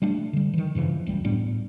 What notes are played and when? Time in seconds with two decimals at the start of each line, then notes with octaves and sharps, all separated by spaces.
0.02 G3 A3 D4
0.33 D3 G3
0.53 D#3 E3
0.75 G2 C#3 E3 F3
1.06 F1 C#2 G3
1.24 A2 G3 B3 D4